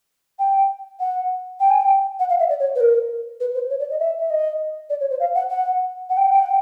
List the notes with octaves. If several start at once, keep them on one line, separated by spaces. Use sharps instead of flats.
G5
F#5
G5
G#5
G5
F#5
F5
E5
D5
C#5
B4
A#4
B4
C5
C#5
D5
D#5
E5
E5
D#5
D5
C#5
C5
F5
F#5
F#5
F#5
G5
F#5
G5
F#5
G5